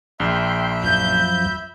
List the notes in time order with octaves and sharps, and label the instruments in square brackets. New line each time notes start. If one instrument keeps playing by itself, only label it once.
[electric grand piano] A#1 [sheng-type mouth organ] E5 B5 [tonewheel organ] G5 C6
[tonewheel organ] F#2 F3 [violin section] G6